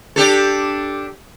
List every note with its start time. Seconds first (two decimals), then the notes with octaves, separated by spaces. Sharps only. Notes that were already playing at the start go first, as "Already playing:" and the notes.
0.16 D4 G4 A4